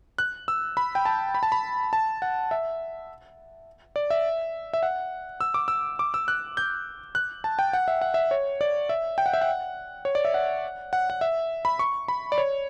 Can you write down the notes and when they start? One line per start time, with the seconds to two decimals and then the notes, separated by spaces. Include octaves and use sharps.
0.18 F#6
0.48 E6
0.77 B5
0.95 G5
1.05 A5
1.35 B5
1.43 A5
1.52 B5
1.93 A5
2.22 F#5
2.51 E5
3.96 D5
4.10 E5
4.73 E5
4.83 F#5
5.41 E6
5.54 D6
5.68 E6
5.99 D6
6.14 E6
6.28 F#6
6.57 G6
7.15 F#6
7.44 A5
7.59 G5
7.73 F#5
7.88 E5
8.01 F#5
8.14 E5
8.31 C#5
8.61 D5
8.89 E5
9.18 G5
9.26 F#5
9.34 E5
9.41 F#5
10.05 C#5
10.15 D5
10.25 E5
10.34 F#5
10.93 F#5
11.10 F#5
11.21 E5
11.65 B5
11.79 C#6
12.08 B5
12.32 D5
12.38 C#5